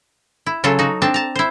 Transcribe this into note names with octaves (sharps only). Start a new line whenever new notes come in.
E4
C#3 F#3 F4 A4
D#4 F#4
C4 D4 A5
A5 A#5
E4 C5